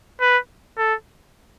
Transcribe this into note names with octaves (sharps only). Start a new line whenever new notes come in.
B4
A4